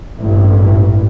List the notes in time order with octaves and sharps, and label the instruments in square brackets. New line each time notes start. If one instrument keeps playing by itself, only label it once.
[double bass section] A1 G2 A#2 E3